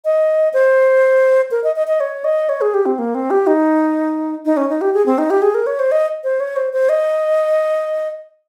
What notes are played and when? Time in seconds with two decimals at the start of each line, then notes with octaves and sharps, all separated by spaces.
0.05 D#5
0.53 C5
1.51 A#4
1.64 D#5
1.76 D#5
1.87 D#5
2.00 C#5
2.24 D#5
2.49 C#5
2.61 G#4
2.74 G4
2.86 C4
2.99 A#3
3.15 C4
3.31 G4
3.47 D#4
4.45 D#4
4.57 C#4
4.69 D#4
4.81 G4
4.94 G#4
5.06 C4
5.18 D#4
5.30 G4
5.42 G#4
5.55 A#4
5.67 C#5
5.79 C5
5.92 D#5
6.24 C5
6.40 C#5
6.56 C5
6.73 C5
6.89 D#5